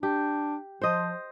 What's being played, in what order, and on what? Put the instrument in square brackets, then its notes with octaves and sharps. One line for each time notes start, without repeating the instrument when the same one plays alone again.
[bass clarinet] D4 [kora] G4
[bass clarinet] F3 [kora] C5 D#5